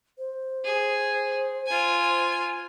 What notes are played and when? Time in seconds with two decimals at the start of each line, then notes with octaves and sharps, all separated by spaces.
0.18 C5
0.65 G#4
1.67 F4 G#5